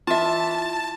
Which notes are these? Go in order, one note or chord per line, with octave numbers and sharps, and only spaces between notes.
E3 F4 E5 A5